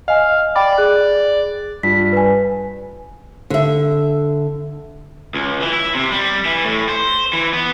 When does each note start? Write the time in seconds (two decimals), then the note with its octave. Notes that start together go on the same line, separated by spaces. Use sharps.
0.08 D#5 F5 G#5
0.55 D5 G5 B5
0.78 G#4 F#6
1.83 G2 F4 B6
2.13 B4 G#5
3.50 D3 E5
5.34 C#2
5.61 E3
5.73 E4
5.95 C3
6.12 G3
6.46 E3
6.65 A2
6.89 C5
7.33 E3
7.53 B3